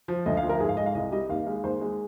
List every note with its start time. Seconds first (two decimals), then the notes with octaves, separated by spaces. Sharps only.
0.08 F3
0.26 D2 D#5
0.37 F5
0.43 F3
0.49 A#4
0.60 G#2 G#4
0.69 F5
0.77 G#3 D#5
0.86 F5
0.95 C2 D#5
1.12 G3 D#5
1.29 D#2 F5
1.47 G#3 F5
1.64 D#2 C5
1.81 G#3